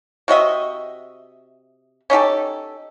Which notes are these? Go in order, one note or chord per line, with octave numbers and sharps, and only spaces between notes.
C3 F#4 D#5 E5
C#4 D#4 G4 A4